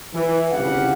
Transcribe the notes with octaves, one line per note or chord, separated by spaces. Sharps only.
E3
G1 C2 C#3 G4 F5 F#5